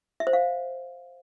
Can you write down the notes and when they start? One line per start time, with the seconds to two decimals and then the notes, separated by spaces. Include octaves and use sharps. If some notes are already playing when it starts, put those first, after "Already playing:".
0.20 E5
0.27 C5
0.33 F5